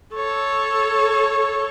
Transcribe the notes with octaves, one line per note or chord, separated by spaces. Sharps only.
A4 C#5